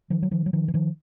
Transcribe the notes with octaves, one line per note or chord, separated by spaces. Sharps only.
D#3 F3
F#3
D#3 F3
F#3
D#3 F3
E3
D#3 F3